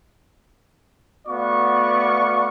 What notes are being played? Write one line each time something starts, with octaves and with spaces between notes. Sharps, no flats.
A3 B3 F#4 D5 F5 C#6